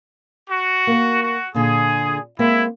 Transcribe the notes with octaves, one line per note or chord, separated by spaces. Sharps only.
F#4
A#3 A#4
F#4
A#2 D3 G#4
G#3 A#3 C4 E4